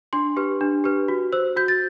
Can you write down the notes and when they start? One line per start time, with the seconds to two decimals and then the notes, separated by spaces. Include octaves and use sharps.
0.13 D4 C6
0.37 G4 B4
0.61 D4
0.84 G4 B4
1.08 F#4
1.32 C5 E6
1.56 F#4 G6
1.68 A6